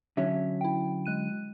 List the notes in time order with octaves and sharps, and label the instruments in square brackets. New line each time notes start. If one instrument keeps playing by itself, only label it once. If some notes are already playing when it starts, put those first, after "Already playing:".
[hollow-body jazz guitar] D3 F#3 C#4 [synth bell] E5
[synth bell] E4 G5
G#3 F#6 D#7